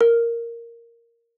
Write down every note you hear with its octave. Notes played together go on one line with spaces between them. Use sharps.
A#4